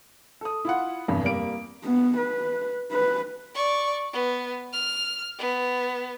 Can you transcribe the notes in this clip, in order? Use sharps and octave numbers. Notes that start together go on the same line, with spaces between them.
A4 D#6
E4 F4 F#5
F1 E2 G2
G3 A#3 D7
B3
B4
B4
D5 C#6
B3
F6
B3